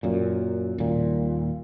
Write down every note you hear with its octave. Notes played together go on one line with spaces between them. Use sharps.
F#2 A#2
D#1 A#2